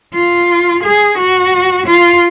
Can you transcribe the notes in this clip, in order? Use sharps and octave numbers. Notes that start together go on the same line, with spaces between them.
F4
G#4
F#4
F4